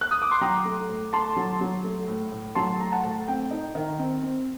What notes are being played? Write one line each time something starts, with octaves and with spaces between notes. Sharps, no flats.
F#6
D#6
D6
C6
F#3 G5 A#5
A3
A2
A3 A5 C6
F#3
F#3
A3
A2
A2
F#3 A5 C6
A2 A#5
F#5 A5
A2
C4 G5
D#4
D#3
C4
C4